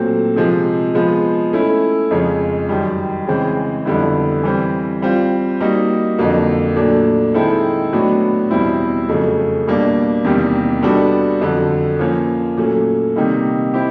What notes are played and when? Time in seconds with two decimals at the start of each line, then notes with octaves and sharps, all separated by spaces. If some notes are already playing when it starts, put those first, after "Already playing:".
Already playing: A#2 F#3 A3 C4
0.36 C3 F3 G#3
0.95 F3 G#3 B3
1.53 A3 C#4 E4
2.11 F2 C#3 F3 G#3 C#4
2.69 F#2 D#3 G3
3.27 C#3 E3 G#3 C4
3.85 F2 D3 G3 B3 E4
4.43 E3 G3 C4
5.02 G3 C4 F4
5.61 G3 A#3 D#4 F#4
6.19 F2 D3 F#3 A#3
6.76 A#2 F#3 A3 D4
7.34 D#3 G#3 C4 E4 A4
7.93 A2 F#3 B3 D4 F#4
8.51 E2 B2 G3 C4 E4
9.08 F2 C#3 F#3 A3
9.67 B2 G3 A#3 D4
10.24 E2 C3 D#3 G3 A#3
10.82 G3 B3 D4 F#4 A4
11.41 F2 D3 F#3
11.99 F3 A#3 C#4
12.57 A#2 F#3 A3 C#4
13.16 C3 D#3 G3 A#3 D#4
13.74 C4 E4 G4